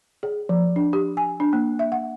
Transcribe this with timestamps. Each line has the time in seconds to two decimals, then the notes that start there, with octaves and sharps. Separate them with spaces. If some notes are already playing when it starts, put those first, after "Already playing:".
0.23 G#4
0.49 F3
0.76 D4
0.93 G4
1.17 G#5
1.40 D4
1.53 A#3
1.79 E5
1.92 F#5